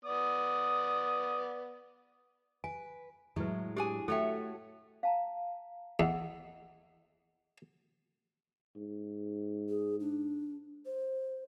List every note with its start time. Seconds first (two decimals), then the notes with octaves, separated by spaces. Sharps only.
0.05 B3 D5 D#6
2.64 B4 G#5
3.36 A2 F#3 G#3 E4 B4
3.77 D4 G4 G#4 G#5
4.08 A3 F#4 A4 C#5 E5 G5
5.03 F5 A5 A#5
6.00 E2 D#5 F#5
8.76 G#2
9.69 G#4
10.00 D4
10.86 C5